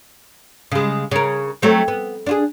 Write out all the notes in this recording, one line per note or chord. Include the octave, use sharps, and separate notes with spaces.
C#3 G#3
C#3 A#4
F#3 A3 C4
B3
D4 F4 G#4